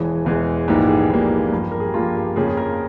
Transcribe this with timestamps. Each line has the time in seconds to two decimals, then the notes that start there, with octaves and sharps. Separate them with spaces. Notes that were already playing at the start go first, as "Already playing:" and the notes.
Already playing: E1 E2 E3 G#3 G#4
0.25 E1 E2 E3 G#3
0.68 A#1 G#2 E3 G3 A#3 G4
0.89 G#4
1.10 A#1 G#2 E3 G3 A#3
1.52 G2 F3 A#3
1.72 A#4
1.80 G#4
1.87 G4
1.94 G2 F3 A#3 F4
2.15 G4
2.36 F2 C#3 F3 A#3 G#4
2.57 A#4